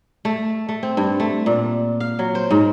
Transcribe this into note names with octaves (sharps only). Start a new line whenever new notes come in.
A3
A3
C4
G2
A3
A#2
F5
F#3
C5
G#2